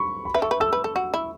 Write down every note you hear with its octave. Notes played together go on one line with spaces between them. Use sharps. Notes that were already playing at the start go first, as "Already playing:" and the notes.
Already playing: B5 C#6
B5
B4 E5
A4 C#6
B4
A4 E6
B4
A4
F#4
E4